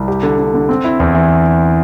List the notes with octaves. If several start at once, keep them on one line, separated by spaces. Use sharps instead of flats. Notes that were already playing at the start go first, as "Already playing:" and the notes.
Already playing: C2
G4
D3
D3
D3
C4
E4
E2
E3